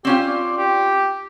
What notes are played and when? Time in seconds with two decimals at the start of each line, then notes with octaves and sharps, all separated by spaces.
0.05 C4 C#4 F4 G4
0.27 D5
0.58 G4